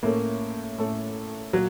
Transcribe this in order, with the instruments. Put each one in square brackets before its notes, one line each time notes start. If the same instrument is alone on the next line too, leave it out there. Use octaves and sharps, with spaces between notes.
[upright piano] A2 A3 C#4 A4 [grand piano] A#3
[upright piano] A2 A3 C#4 A4
[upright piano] A#2 [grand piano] F#3